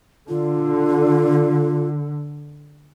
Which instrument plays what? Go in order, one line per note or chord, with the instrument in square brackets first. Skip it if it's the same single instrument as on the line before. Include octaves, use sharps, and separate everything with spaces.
[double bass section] D3 [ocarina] F4